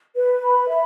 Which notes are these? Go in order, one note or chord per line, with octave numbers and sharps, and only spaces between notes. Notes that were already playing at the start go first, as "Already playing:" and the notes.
B4
B5
E5